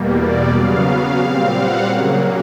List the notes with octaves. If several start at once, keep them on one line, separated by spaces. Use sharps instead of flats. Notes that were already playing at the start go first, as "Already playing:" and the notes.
Already playing: E2 B2 G3 A#3
D5
C#3 F#3 B3 F5
A#2 G3 C4 F5
F#5
C#3 F#3 A#3